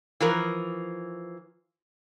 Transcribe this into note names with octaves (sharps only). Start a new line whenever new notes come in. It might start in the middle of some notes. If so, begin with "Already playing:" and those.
E3 F3 A#4